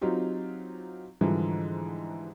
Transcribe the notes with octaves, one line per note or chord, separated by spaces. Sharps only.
F#3 C4 D#4 F4 G4
G#2 D3 E3 F3 G3